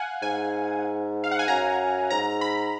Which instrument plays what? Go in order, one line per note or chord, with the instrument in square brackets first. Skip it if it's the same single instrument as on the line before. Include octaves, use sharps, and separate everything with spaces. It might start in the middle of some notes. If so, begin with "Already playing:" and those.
Already playing: [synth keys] F5 F#5 G#5
[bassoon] G#2 [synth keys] G#5
[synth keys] F5
F#5
G#5
[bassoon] F#2 [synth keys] A#5
[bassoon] G#2 [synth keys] A#5
[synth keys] B5